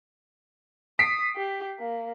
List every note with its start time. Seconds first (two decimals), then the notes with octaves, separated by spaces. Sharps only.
0.99 D#6 B6 C7 D7
1.36 G4
1.79 A#3